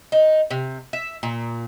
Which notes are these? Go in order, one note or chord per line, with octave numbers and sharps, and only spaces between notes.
D#4
C3
E5
A#2